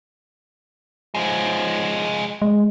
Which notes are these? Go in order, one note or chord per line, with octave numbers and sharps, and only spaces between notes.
F3 G#3
G#3